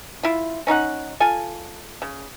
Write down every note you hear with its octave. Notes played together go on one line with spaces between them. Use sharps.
E4 F4
C#4 D#4 A#4 F#5
F4 A4 G#5
C#3